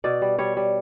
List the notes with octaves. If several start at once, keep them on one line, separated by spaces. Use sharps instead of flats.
B2 D5
G3
G3 C#5
G3